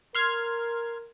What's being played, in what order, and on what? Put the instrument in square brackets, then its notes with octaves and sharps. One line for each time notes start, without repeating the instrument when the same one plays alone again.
[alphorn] A#4 [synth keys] C6 F6 G#6